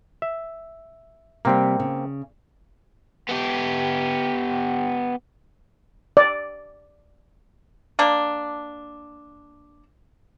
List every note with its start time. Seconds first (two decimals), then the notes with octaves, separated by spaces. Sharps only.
0.22 E5
1.45 C3 G3 A#3 C4
1.80 C#3
3.29 B3 G4
6.17 D5
7.99 A#3 D4